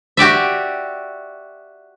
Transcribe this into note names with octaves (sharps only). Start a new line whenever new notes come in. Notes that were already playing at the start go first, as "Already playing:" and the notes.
F#4 G4 D5 E5